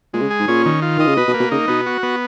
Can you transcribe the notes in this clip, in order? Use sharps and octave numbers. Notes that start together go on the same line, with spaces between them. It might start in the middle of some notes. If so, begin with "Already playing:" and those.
A#2 G#3
C#3
G#4
G#2
A#2 C#4
D#3
F4
D#3 D#5
C#3
B2 B4
B2
A#3
B2
C#3 D#4
B2 B3
F#4
B3